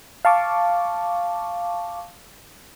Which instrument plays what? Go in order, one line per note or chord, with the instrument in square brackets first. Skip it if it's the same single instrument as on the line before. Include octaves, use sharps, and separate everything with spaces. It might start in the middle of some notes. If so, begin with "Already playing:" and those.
[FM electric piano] F5 A5 C#6 D6